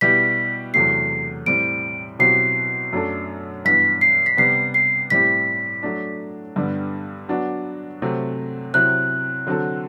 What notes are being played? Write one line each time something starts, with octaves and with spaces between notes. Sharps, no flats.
B2 G3 B3 E4 G4 B6
E2 C3 F#3 A3 C7
A2 G3 C4 D7
B2 F#3 C4 E4 G4 C7
F#2 F#3 A3 D4 A4
G2 E3 B3 B6
C7
B6
C3 G3 B3 C7
C7
A2 G3 C4 E4 G4 B6
F#3 A3 D4
G2 D3 G3 B3
F#3 B3 D4 F#4
C3 F#3 A3 C4
C3 F#3 C4 E4 F#6
D3 F#3 C4 F#4 A4